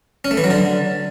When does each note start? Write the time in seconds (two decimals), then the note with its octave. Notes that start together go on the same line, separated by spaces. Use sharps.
0.25 C#4
0.31 A3
0.37 E3
0.44 F#3
0.50 D3